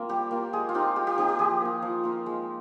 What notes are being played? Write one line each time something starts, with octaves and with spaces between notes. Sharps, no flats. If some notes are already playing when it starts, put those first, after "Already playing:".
Already playing: A#3 C4 F4
G3 G4
A#3 F4
G#3 G#4
F4
C4 D#4 G4
G#3 G4
G4
C4 D#4 G4
G4
F3 G#4
A#3 F4
F3
A#3 F4
G#3